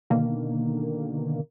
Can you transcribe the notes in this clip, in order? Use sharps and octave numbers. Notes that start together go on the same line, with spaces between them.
B2 D3 D#3 A#3